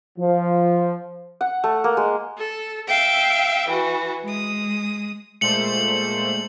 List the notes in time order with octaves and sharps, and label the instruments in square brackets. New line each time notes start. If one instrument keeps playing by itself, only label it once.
[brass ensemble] F3
[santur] F#5
A3
A#3
G#3
[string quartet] A4
E5 F5 G5
E3 F#4
G#3 D#6
[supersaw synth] A#2 A3 C5 [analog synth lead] G#3 [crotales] C#7 F#7